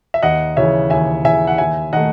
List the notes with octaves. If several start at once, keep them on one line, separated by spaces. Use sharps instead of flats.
E5
D#2 D#5 F#5
C#3 E3 C#5 E5
D#2 E5 G#5
C#3 E3 E5 G#5
F#5
D#2 E5 G#5
D#3 A3 D#5 F#5